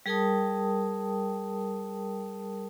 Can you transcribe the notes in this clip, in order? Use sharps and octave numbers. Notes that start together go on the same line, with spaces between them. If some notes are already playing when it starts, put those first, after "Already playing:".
G3 G#4 A#4 G5 A5 D#6